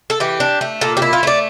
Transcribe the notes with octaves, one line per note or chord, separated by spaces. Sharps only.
A4
E3 G4
D4
A3
A#2 A4
G4
E4
F4
A3 D5